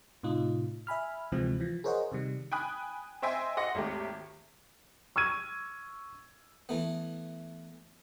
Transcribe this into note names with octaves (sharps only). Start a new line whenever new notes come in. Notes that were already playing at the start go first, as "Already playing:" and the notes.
A2 C3 D#4 F4
E5 G#5 B5 F6
D2 C3 E3 F3 G#3 C4
E3 F3
G#4 A#4 C5 C#5 D#5 F#5
C3 D#3 G3
G5 G#5 B5 D#6 F#6
C5 D#5 E5 G5 G#5 C6
D#5 F#5 C6 A#6 C#7
G#1 D#2 A3 G4
C#6 E6 F6 G#6 D#7
E3 A3 B3